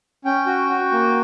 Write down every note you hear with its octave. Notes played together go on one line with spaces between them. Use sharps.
C#4 G5
F#4
F#4
A#3